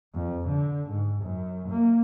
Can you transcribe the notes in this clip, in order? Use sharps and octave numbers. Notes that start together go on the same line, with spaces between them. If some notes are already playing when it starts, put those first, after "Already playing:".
F2
D3
G#2
F#2
A#3